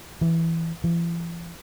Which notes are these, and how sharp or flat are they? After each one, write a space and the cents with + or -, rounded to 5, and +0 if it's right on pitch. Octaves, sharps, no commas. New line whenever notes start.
E3 +5
E3 +45